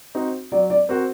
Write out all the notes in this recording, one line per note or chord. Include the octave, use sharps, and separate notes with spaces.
C4 D#4 F#4
F#3 D5
D5
C4 F#4 A#4